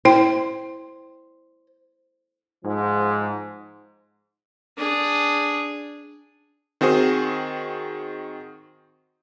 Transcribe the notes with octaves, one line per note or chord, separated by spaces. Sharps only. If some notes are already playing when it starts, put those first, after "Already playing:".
E4 C5 G5
G#2 F3
D4 G#4
D#3 C4 F#4 G#4 C5